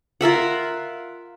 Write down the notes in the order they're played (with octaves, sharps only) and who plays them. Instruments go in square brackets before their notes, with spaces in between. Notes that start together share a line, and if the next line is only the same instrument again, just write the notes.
[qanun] F4 A#4 E5 F#5